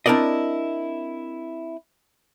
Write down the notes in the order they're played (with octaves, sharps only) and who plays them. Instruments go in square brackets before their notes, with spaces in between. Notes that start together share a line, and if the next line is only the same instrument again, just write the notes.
[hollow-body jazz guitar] C4 D4 E4 A#4 D5 D#5